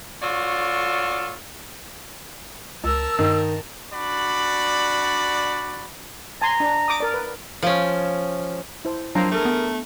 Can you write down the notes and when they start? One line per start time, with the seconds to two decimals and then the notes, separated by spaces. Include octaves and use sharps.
0.22 F4 F#4 A4 C#5 D5
2.84 C#2 A#4 A5 E6
3.19 G2 D#3 D#4
3.93 D4 F#4 D5 B5
6.42 G#5 A#5 C6
6.60 D4
6.88 D6 D#6
7.00 A#4 D5
7.14 B4
7.62 F3 C#4
8.85 E4 C5 A5
9.15 F3 F#3 A#3 C4 D4 A#5
9.32 E2 A3 G#4 A#4
9.45 B3